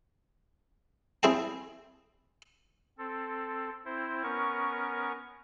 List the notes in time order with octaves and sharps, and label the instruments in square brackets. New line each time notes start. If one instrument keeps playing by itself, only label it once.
[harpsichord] C4 E4 G#4 G5 A5
[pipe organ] C4 A4
C4 E4 C5
B3 C#4 A#4 C#6